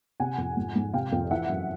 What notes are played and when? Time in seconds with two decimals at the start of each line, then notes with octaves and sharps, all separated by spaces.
0.20 C3 F#5 G#5
0.38 F2
0.57 G#1
0.76 G#2
0.93 C3 F5 G5
1.12 F2
1.31 E3 E5 F#5
1.50 F#2